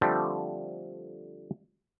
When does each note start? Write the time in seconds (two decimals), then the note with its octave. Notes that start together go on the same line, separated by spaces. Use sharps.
0.01 D3 F3 G3 A3 C4 D4